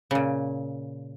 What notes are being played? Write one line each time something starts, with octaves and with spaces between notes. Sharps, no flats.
A#2 C#3